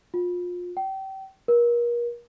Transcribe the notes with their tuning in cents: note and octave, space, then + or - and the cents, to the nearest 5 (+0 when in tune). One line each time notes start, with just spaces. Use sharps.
F4 +30
G5 -30
A#4 +35